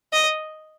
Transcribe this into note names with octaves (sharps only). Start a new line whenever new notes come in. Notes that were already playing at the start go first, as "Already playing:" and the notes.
D#5